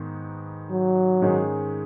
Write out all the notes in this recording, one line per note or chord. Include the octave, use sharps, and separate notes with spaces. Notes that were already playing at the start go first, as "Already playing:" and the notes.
Already playing: G#2 D#3 B3
F#3
G#2 D#3 G#3 C#4